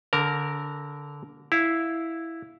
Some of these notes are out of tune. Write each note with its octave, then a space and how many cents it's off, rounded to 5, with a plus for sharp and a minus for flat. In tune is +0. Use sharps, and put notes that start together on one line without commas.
D3 -20 A#4 +0 A#5 -40
E4 +0 F5 +0